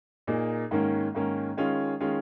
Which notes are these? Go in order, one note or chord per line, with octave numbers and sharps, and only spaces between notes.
A#2 A#3 D#4 G#4
G#2 D#3 A#3 C#4
G#2 D#3 A#3 C#4
D#3 G#3 C#4 F4
D#3 G#3 C#4 F4